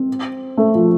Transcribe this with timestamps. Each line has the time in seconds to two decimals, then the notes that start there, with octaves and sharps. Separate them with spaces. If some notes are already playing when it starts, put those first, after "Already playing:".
Already playing: C4
0.57 A3
0.75 F3